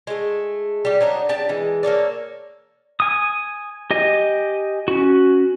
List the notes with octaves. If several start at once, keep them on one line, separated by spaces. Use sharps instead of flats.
G#3 A3
G3 G4
F#3 D4 D#4
D4 G4 A5
E3 G#3
A#3 A4 C#5 D5
G#5 D#6
G4 D#5 G#5
C#4 F#4